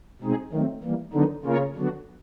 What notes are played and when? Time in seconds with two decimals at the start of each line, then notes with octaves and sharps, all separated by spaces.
0.21 B2 G#3 C4 D#4 G#4
0.52 D#3 F#3 A3 C4
0.83 E3 G3 A#3
1.13 D3 D#3 F#3 B3 D#4
1.44 C#3 A#3 C#4 F4 A#4 C#5
1.75 D3 F#3 B3 D4 F#4